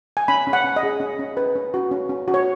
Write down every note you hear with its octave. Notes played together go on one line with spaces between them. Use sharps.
G#5
C#4 B5
C#4
F#5
C#4
D#5
G#4
C#4
C#4
B4
C#4
F#4
C#4
C#4
F#4
C#5